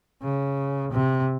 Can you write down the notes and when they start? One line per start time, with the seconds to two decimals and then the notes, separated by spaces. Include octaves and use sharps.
0.23 C#3
0.91 C3